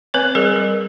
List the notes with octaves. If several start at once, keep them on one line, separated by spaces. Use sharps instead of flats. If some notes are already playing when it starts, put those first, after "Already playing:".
C4 B4 C#5
G3 G#4 A#4
G3